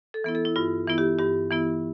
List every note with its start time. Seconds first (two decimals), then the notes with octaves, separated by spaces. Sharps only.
0.14 A4
0.24 E3 B3 E4
0.35 A4
0.45 E4
0.56 G2 F4
0.87 E3 B3 E4
0.98 G4
1.19 G2 G4
1.51 E3 B3 E4